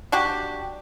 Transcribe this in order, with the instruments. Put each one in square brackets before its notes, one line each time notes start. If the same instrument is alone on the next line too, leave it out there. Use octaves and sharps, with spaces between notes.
[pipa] D4 F#4 G4